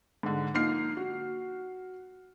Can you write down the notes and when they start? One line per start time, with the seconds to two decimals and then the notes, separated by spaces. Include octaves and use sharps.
0.23 G#2 D3
0.54 F3 A#3 D#4 F6 C7
0.97 F#4